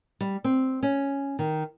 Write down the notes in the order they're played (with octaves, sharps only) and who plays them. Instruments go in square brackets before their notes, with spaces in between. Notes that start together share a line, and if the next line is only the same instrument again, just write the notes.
[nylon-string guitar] G3
C4
C#4
D#3